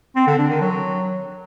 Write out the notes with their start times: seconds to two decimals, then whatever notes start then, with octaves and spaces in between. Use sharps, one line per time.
0.16 C4
0.27 D3
0.38 D4
0.50 D#3
0.61 F#3